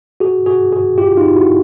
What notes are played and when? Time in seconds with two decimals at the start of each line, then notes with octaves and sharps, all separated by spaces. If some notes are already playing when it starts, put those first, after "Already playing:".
0.20 F#4 G#4
0.46 F#4 G#4
0.72 F#4 G#4
0.98 F4 G4
1.17 D#4 F4
1.36 E4 F#4